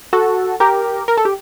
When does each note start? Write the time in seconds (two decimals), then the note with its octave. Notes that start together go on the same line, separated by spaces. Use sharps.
0.13 F#4 A4
0.60 G4 A#4
1.08 A#4
1.18 A4
1.25 G4